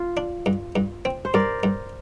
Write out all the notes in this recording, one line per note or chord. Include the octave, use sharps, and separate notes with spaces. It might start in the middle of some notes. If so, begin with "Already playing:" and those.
Already playing: F4
D4
G2
G2
C4
C5
G2 A#4 D5
G2